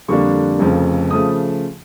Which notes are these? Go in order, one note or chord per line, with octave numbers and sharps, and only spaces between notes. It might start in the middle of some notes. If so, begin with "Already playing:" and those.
F2 D3 G3 A#3 D4 C#6
F1 F2 C#3 F3
C#3 F3 A3 D#6